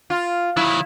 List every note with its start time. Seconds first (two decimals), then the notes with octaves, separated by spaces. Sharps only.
0.10 F4
0.57 D#3 F#3 E4